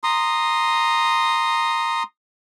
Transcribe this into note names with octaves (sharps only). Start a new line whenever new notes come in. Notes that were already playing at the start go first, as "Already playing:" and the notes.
A#5 C6 D#6